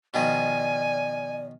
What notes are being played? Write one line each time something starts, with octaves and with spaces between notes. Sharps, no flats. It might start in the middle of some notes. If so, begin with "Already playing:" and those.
B2 D#3 F3 D5 G#5